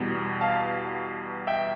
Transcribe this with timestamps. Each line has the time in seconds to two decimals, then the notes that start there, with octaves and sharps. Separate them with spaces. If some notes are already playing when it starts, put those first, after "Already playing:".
Already playing: E2 B2 G3
0.41 F5 A5
1.47 E5 G5